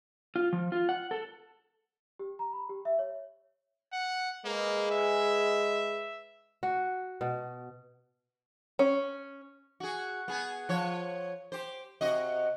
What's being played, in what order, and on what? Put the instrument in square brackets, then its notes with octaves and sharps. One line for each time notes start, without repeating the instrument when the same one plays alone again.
[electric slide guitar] F4
F3
F4
F#5
A4
[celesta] G4
A#5
B5
G4
E5
C#5
[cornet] F#5
[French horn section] G#3 G#4 B4 [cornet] A#3
[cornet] E5
[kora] F#4
B2
[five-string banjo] C#4
[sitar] F#4 G#4
B3 G#4
F3 C#5
G4 C5
C3 F#4 D#5